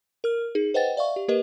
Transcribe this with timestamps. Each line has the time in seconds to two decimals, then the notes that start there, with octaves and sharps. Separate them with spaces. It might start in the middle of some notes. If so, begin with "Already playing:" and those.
0.24 A#4 F6
0.55 D#4 G#4
0.74 B4 C5 D#5 F#5 G5 A6
0.97 D5 E5 F5 C#6
1.16 G4
1.28 A#3 G4 A#4 B4 D#5